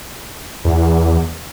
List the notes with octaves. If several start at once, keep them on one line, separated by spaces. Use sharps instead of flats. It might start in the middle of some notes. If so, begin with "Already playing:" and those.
E2